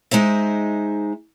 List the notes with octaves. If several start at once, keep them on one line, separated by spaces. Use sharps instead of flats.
G#3 D#4 C5 E5